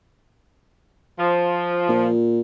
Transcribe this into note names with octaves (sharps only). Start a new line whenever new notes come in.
F3
A#2